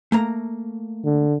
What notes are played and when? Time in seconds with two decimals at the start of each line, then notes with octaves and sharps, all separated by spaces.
0.12 A3 A#3 A#5
1.05 D3